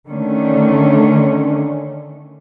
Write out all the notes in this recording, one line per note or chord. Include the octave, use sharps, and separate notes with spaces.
D3 D#3 A3 C#4 D4